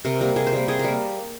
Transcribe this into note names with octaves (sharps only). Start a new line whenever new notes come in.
C3 A#4
G3 A#3 A#4
C3 G#4
C5
G3 A#3
C3 G#4
A#4
G3 A#3